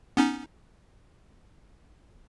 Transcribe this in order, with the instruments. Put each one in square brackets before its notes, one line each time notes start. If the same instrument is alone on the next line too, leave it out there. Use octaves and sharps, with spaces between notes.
[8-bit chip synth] B3 C#4 D#4